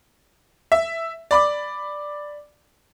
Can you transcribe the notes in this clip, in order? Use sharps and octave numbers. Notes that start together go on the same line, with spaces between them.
E5
D5 B5 D6